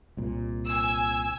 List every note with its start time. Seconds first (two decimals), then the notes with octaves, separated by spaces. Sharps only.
0.17 C2 A#2
0.67 G#5 E6